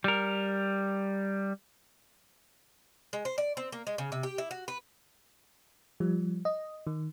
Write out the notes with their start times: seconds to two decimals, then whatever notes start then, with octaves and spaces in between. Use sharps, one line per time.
0.04 G3 A#4
3.13 G#3
3.25 C5
3.38 D5
3.57 C4
3.72 A#3
3.87 G#3
3.98 C#3
4.12 C3
4.23 G4
4.38 E4
4.51 F#4
4.68 B4
6.00 F3 G3
6.45 D#5
6.87 D#3